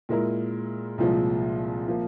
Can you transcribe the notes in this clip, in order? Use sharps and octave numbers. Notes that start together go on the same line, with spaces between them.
A#2 G#3 E4 A#4
C2 A#2 F3 G#3
F3 A#3